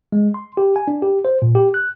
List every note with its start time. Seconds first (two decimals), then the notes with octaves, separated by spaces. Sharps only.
0.12 G#3
0.34 C6
0.57 G4
0.76 G#5
0.88 D4
1.02 G4
1.25 C5
1.42 A#2
1.55 G4
1.74 F#6